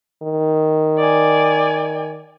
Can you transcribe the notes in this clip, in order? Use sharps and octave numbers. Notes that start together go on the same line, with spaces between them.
D#3
D5 G#5